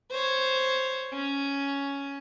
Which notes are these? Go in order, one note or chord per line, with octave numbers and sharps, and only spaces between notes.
C5 C#5
C#4